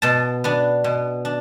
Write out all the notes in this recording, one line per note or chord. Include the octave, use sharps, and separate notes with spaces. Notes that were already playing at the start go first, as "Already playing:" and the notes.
B2 A5
B3 D4
B2
D4